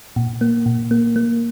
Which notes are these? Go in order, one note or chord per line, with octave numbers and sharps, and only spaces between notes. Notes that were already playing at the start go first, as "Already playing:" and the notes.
A#2
A#3
A#2
A#3
A#3